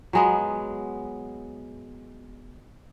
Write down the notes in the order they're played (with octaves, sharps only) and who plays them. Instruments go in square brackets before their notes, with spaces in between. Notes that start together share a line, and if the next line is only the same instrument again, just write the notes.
[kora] F#3 G#3 B3